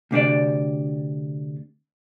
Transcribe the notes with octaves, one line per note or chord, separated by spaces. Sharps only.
D2 C3 D4 D5